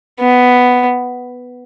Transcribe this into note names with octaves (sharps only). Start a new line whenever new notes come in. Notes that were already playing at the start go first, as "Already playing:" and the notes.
B3